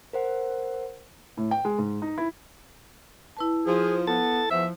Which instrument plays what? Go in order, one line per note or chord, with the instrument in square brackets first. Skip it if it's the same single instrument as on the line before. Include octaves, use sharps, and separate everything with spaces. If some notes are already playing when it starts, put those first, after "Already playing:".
[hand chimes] A#4 C5 F#5
[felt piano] A2
G5
G#3
G#2
D#4
E4
[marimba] E4 B4 A5
[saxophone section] F3 [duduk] G#4
[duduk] B3 [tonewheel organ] A4 A6
[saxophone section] E2 C5 E5 [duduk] F3